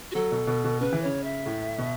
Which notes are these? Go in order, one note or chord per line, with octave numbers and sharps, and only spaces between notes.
F#4
F#3 A4
B2
B2
B2
C#3 B4
E3
C#3 C#5
E5
A2
B2